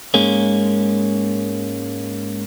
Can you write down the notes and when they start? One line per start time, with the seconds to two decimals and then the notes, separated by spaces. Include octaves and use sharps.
0.14 G#2 G#3 A#3 C#4